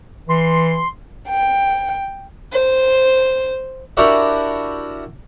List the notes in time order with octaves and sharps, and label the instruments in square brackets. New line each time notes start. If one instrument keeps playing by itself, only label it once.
[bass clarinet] E3 [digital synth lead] C6
[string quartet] G5
[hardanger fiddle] C5
[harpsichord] D4 E4 F#4 G4 A#4 F#5